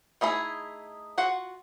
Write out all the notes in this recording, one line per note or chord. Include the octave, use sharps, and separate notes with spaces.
A3 D#4 E4 G#4
F4 F#4 F#5